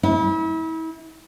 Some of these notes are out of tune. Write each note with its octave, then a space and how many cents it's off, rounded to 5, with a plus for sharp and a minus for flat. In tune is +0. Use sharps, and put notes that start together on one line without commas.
E4 -35